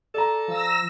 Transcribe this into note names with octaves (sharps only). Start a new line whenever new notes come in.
A4 D5 A#5
F3 E6 A#6